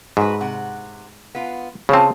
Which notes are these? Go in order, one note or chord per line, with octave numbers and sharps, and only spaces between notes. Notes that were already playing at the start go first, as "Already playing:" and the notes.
G#2 F#4 B4
C3 F#5
B3 F4
C#3 C4 F4 C5 A5